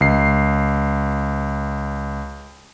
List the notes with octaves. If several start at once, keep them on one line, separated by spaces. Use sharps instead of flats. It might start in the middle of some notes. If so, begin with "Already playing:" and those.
C#2 C7